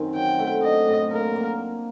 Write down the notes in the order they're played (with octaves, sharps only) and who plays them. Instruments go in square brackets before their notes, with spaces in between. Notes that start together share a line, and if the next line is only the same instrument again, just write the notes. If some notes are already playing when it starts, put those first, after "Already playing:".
Already playing: [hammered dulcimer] F#2 D#3 C4
[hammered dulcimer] F#3 [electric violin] G5
[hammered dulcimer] A3
[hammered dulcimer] D4 [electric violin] D#5
[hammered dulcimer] A2
[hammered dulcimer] A#3 [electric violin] A#4
[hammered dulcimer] A#3